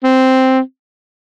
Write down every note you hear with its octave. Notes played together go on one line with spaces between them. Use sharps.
C4